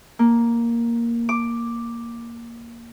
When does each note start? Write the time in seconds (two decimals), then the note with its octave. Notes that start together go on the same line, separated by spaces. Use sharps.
0.19 A#3
1.29 D6